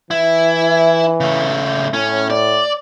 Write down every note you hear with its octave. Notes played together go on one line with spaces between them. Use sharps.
E3 E4
C#3 A3
A2 C#4
D5